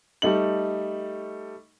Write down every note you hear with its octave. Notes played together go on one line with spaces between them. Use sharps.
G3 A3 D#4 F#7